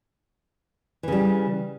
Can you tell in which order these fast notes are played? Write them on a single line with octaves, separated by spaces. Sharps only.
E3 C#3 G3